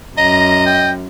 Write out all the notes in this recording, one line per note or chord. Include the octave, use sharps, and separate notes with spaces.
F#2 D#5 A#5
G5